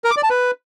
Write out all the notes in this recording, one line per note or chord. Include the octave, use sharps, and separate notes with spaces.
A#4
D6
D5
A5
B4